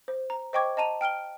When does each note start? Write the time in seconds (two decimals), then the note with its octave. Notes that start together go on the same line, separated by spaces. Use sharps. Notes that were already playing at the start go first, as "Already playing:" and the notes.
0.08 C5
0.30 A#5
0.53 C5 D#5 G5 C#6 D6 G#6
0.77 D#5 A5 A#5 D#7 F7
1.01 G5 F6 D7 G7